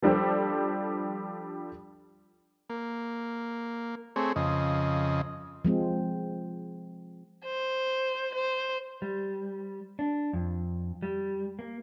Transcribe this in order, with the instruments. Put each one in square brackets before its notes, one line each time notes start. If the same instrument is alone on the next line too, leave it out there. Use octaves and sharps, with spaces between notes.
[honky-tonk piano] F3 G3 D4 G4 A4 C5
[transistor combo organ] A#3
A3 C4 G#4 C#5
F2 C#3 D#5
[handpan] F3 G#3 C4
[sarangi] C5
C5
[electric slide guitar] G3
D4
F2
G3
A#3